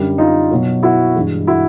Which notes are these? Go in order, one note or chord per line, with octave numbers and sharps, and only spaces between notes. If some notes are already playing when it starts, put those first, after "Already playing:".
Already playing: F#2 D3 G3
D#4 F4
B2 F#3
E4 F#4
G2 E3 G#3
E4 F#4